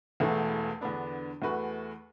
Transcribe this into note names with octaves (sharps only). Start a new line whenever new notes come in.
E1 E2 E3 A3
E2 D3 B3 D4
E2 E3 A3 F#4 B4